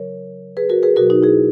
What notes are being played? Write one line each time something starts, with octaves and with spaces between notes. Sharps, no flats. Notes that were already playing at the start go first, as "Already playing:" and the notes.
Already playing: C#3 F#3 A#4 C#5
G#4 B4
F#4 A#4
G#4 B4
B2 F#3 F#4 A#4
D#4 F#4
E4 G#4